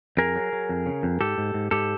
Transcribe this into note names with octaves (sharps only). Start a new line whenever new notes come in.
F2 G#4 A#4
F#3
F#3
F2
C#3
F2
G#2 G4 A4
G#2
G#2
G#2 G4 A4